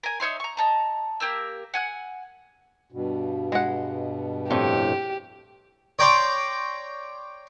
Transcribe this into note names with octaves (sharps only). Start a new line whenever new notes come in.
A#4 G#5
D#4 C#5 E5 C6
A#5 C#6
D#5 A5 A#5
A#3 G4 A#4 E6
F#5 G#5 F#6
G2 B2
G#3 F#5
F2 A2 G4
C#5 D5 G5 A#5 C6 D6